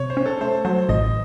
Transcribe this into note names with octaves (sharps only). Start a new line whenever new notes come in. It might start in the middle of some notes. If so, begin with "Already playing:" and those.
Already playing: C3 C#5
C5
C#4
A4
A3 C5
F#3 C5
A1 D#5